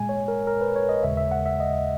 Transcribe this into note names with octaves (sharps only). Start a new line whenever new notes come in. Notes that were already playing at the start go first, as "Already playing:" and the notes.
Already playing: A#2 G#3 G#5
C#5
A#4
A#4
B4
C#5
D#5
D#2 C#3 G#3 E5
E5
F#5
E5
D#5